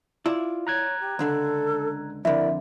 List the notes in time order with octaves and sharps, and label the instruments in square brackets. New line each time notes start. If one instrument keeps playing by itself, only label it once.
[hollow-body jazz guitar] E4 D5 [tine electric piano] F4
[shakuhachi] C#5 [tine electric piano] A#5 F#6 G#6
[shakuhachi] G4
[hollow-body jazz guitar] C#2 D3 D4 [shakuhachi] A4
[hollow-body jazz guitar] F2 D3 [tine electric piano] E4 A#4 [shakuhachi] D5 [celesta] E5